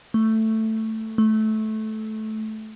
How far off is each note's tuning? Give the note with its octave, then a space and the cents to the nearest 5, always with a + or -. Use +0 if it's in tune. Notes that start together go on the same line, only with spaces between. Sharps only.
A3 +5
A3 -15